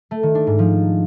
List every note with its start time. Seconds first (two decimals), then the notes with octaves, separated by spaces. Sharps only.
0.11 A3
0.23 D#3
0.35 D4
0.47 G#2
0.59 F3